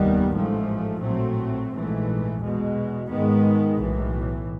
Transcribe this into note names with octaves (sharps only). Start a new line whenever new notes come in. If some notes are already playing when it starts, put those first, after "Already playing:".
Already playing: F1 D#2 D#3 G3 B3
A1 G#2 F3 A3
A#1 A2 F#3 A3 C4
A#1 G#2 E3 A3
E2 B2 G#3
G#2 D#3 G#3 B3
B1 A2 E3